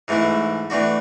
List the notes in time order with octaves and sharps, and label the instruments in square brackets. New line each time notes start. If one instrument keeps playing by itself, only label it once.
[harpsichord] G#2 E3 A3 E4
E3 A3 D4 F#4